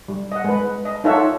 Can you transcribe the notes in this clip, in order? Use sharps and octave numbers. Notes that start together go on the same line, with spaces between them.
G3
D#5 F#5
G#3 B4
D#5
D#4 F4 A4 C#5 E5 F#5